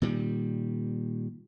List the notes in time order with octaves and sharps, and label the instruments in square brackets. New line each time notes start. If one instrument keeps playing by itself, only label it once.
[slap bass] A#2 D#3 G3